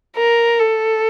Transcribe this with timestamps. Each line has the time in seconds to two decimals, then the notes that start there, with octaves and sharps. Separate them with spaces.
0.17 A#4
0.59 A4